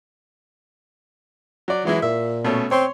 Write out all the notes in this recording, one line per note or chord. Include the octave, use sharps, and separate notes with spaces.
F#3 D5
E3 F#3 G#3 E4
A#2 E5
B2 A3 C#4
C4 C#5 C6